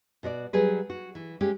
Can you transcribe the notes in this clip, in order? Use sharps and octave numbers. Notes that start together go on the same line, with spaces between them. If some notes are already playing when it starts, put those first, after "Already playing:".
B2 F#4 C#5 D5
F#3 G3 G#4 B4
F#4
E3
G#3 A3 C#4 G4